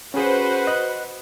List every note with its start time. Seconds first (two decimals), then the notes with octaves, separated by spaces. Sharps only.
0.14 C#4 F#4 G#4 B4 C5
0.67 D#5 F#6